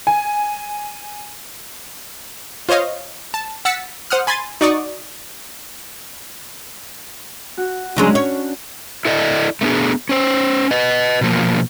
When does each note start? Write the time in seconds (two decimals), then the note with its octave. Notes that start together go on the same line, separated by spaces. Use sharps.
0.07 G#5
2.69 F4 C5 C#5 D#5 F5
3.34 A5
3.65 F#5 E6 A6 B6 C#7
4.10 C5 F#5 D#6 F6
4.27 G#5 B5 C6 G#6 A6 D#7
4.61 D#4 F#4 D5 C#6 D#6
7.57 F#4
7.96 C#3 F#3 G#3 C#4 D4
8.15 C#5
9.05 E4 A4 D5 D#5
9.61 A3 B3 D4 G#4
10.09 C#4 C5
10.71 B4 D#5
11.21 B2 F3 A#3